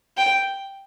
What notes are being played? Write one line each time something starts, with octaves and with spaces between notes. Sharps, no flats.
G5